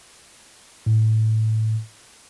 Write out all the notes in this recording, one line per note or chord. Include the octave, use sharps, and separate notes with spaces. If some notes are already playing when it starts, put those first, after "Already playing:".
A2